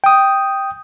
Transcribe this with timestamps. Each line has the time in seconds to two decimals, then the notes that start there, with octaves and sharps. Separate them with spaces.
0.04 G5 D#6